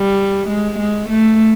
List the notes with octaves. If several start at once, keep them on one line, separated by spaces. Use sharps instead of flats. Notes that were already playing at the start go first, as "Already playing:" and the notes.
Already playing: G3
G#3
G#3
A3